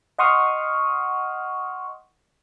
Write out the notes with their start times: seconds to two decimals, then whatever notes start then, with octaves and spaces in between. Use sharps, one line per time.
0.19 D#5 F#5 C6 C#6 D#6 F6